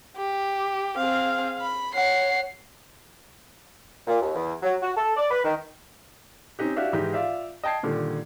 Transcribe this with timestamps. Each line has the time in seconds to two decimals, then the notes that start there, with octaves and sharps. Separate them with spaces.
0.16 G4
0.97 C4 G#4 F5
1.61 B5
1.95 C#5 F#5 C7
4.07 A#2
4.21 D#2
4.35 E2
4.63 F#3
4.82 F#4
4.96 A4
5.17 D5
5.31 B4
5.44 D#3
6.59 C4 C#4 D#4 G4
6.76 D4 E4 F#4 G4 E5 F5
6.93 G#2 E3 D#4 G4
7.13 F4 D5 E5 F5
7.63 D#5 G5 A5 G#6 C7
7.83 A#2 D3 D#3 G3